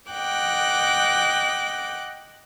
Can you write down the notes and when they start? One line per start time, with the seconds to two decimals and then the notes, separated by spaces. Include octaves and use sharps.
0.12 D#5 F#5 G5 D6 F#6